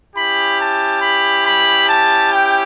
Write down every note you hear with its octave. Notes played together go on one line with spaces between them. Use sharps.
C#4 E4 G4 B5
A5
B5
B5
A5
G5